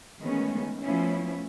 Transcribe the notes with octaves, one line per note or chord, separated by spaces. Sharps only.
D#3 E3 G#3 A3 B3 C#4
F3 A3 B3 C#4 E4